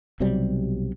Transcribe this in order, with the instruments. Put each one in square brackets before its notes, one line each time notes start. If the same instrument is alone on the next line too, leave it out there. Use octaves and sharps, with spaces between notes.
[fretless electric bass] B1 C3 F#3 G3